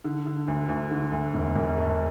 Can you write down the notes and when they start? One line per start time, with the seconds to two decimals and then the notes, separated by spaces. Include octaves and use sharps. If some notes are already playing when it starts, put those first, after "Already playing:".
0.04 D3
0.26 D3
0.48 D2
0.69 D2
0.91 D3
1.12 D2
1.34 E1
1.55 E1
1.78 A3